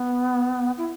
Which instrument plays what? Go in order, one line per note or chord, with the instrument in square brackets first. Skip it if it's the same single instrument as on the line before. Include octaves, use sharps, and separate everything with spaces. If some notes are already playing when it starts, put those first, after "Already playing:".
Already playing: [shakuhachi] B3
E4